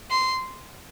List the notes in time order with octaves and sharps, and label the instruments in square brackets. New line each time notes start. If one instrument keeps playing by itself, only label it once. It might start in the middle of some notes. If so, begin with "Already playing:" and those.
[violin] C6